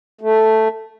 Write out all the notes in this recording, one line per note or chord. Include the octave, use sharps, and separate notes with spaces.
A3